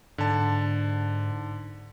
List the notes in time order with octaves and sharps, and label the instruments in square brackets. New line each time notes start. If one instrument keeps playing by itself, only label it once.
[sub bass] G#2 [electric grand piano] D3 A5